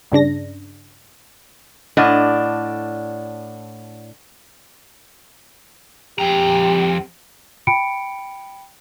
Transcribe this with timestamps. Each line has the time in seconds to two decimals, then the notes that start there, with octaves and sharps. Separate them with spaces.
0.12 G2 C#3 D4 A#6
1.97 A2 D4 D5 D#5 F#5 F6
6.18 F2 G4 G5 A#5
7.67 G5 B5 C#7 D7